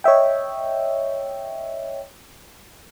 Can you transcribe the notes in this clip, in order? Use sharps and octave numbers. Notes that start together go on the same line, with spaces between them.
C#5 D#5 E5 G5